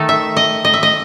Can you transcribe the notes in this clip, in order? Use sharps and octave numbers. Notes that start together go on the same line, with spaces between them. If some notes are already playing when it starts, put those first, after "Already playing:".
Already playing: D#3 A3 D#4 A4
E5
D#5
D#5
E5
D#5